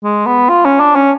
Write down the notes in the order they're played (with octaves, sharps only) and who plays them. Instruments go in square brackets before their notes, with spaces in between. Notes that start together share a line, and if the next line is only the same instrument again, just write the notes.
[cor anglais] G#3
B3
F4
C#4
D4
C#4